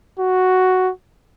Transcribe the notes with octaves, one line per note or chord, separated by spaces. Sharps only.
F#4